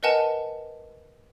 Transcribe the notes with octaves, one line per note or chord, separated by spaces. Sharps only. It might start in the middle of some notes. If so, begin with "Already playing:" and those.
A#4 B4 D#5 F#5 G#5 A5